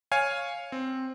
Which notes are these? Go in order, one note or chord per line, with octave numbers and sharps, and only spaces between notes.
C#5 F5 G#5
C4